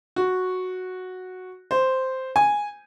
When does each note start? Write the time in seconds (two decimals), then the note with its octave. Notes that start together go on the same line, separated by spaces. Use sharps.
0.16 F#4
1.71 C5
2.36 G#5